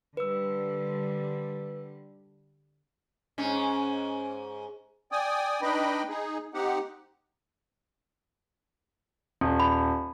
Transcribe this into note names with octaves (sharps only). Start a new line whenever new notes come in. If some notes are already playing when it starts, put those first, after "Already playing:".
D3 G3 B4 E6
G#2 C#4
D5 G5 G#5 D#6
D4 D#4 B4 D#5 G5 B5
D#4 G#4
C4 D#4 G4 F#5
D#1
B5